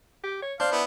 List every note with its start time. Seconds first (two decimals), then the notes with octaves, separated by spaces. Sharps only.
0.24 G4
0.42 C#5
0.60 D4 C5 F5
0.72 B3 E4